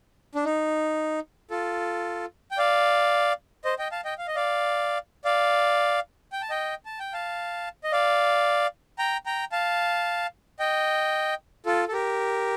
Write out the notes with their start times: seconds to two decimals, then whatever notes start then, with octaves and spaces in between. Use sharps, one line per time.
0.35 D4
0.45 D#4
1.51 F4 A4
2.51 G5
2.58 D5 F5
3.65 C5 D#5
3.79 D#5 G5
3.92 F5 A5
4.05 D#5 G5
4.18 F5
4.27 D#5
4.35 D5 F5
5.25 D5 F5
6.32 G5
6.42 A5
6.50 D#5 G5
6.86 A5
7.00 G5
7.13 F5 A5
7.84 D#5
7.92 D5 F5
8.99 G5 A#5
9.26 G5 A#5
9.52 F5 A5
10.59 D#5 G5
11.66 F4 A4
11.88 A4
11.93 G4 A#4